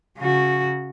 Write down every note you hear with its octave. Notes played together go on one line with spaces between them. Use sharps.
C#3 F#4